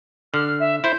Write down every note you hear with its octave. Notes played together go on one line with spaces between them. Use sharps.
D3 F6
E5
E4 C5 G6